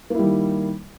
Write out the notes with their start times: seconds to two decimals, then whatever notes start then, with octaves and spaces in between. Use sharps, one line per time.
0.10 A#3
0.15 E4
0.19 G3
0.23 D#3